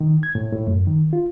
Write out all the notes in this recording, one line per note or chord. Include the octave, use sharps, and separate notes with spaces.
D#3
G#6
A2
A2
F#2
D#3
F4